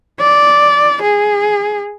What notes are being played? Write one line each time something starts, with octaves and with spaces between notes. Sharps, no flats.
D5
G#4